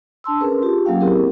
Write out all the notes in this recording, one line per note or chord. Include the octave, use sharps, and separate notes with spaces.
D4 A5 C6 E6
C#4 G#4 A#4 B4
F4 G4
F#3 A#3 C#4 F5 G5
C4 E4 G4 G#4 A#4